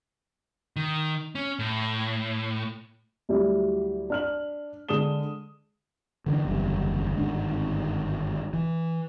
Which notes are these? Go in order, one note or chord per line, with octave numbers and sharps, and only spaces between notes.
D#3
C#4
A2
D2 F#3 G3 E4
D4 F6 F#7
D3 G#3 G#4 D#6 E7 G7
D3 E3 G#3 D4
F#1 E2 D3 G3
G1 G#2 D#3 D4
E3